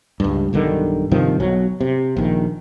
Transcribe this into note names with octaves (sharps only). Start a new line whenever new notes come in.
C#2 G2
B1 G2 D3 D#3
G2 C3 D#3 F3
B1 F#3
C3
A#1 D#3